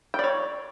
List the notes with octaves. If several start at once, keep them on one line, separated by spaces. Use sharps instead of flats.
C#5 D5 G5